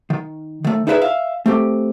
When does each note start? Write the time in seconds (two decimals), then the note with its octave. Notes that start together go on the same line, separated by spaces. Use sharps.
0.10 D#3
0.64 D#3 A3
0.87 D#4 E4 G#4 B4 C5 E5
1.02 E5 F5
1.46 A3 C4 G4